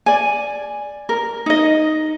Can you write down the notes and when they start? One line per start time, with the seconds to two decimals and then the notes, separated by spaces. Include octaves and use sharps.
0.06 D5 G#5
1.09 A#4
1.46 D#4 D#5